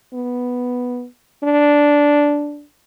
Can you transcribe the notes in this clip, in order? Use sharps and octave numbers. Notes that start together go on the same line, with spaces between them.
B3
D4